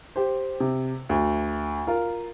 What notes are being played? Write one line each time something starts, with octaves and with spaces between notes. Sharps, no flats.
G4 C5
C3
D2
F4 A#4